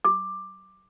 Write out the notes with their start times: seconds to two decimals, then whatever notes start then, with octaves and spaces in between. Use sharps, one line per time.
0.05 D6